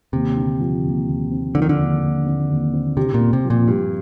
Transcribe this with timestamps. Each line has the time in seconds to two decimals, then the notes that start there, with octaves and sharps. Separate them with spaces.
0.13 D#2 C3
0.37 D3
0.60 F3
0.85 D#2
1.08 D#2
1.31 C4
1.55 D3 F3
1.62 D#3
1.69 D3
1.79 D#2
2.03 D#2
2.26 C4
2.50 D#2
2.73 C4
2.97 C3 G4
3.14 A#2
3.21 C4
3.33 C3
3.44 F3
3.50 A#2
3.68 G2 G4